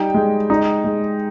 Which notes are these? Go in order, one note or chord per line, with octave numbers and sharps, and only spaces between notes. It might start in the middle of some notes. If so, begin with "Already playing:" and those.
Already playing: G3 D#4 G5
G#3
D#4
G#3